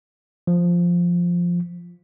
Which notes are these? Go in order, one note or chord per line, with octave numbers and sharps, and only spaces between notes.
F3